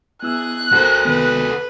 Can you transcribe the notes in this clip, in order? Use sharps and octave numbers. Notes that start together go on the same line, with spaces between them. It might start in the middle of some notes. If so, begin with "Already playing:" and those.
B3 E4 G#4 E6 F#6
F#4 A4 A#4 C5
C3 D#3 B3 B4